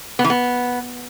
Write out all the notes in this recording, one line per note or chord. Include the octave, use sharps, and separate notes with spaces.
B3
E3
B3